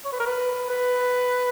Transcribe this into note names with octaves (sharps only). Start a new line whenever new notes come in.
C#5
B4
A#4
B4
B4